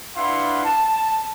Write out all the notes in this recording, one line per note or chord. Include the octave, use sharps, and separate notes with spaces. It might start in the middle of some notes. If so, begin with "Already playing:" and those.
D4 E4 B4 F5 F#5 C6
A5